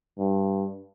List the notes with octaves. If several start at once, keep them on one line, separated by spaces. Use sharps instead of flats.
G2